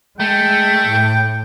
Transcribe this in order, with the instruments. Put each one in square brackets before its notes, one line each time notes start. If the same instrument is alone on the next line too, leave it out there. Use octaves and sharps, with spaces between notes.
[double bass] G#3 [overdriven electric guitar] A3 [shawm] G5
[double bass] A2